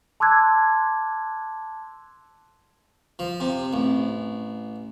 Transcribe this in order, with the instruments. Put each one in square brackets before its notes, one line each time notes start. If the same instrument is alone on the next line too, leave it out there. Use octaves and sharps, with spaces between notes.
[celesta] A5 C6 D6 E6 F#6 G#6
[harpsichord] F3
C3
A1